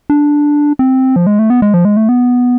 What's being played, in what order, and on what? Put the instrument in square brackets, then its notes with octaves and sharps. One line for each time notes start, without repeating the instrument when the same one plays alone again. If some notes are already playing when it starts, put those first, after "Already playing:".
[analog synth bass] D4
C4
F3
G#3
A3
B3
G#3
F3
G#3
A3
B3